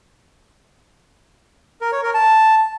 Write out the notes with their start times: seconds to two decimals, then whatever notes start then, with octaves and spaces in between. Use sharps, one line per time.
1.81 A#4
1.92 C#5
2.03 A#4
2.14 A5